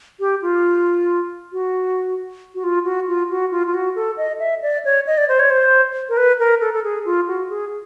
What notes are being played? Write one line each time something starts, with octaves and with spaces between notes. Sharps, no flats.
G4
F4
F#4
F#4
F4
F#4
F4
F#4
F4
F4
F#4
A4
D#5
E5
D5
C#5
D#5
D5
C5
C#5
C5
A#4
B4
A#4
A4
A4
G#4
F4
F#4
G#4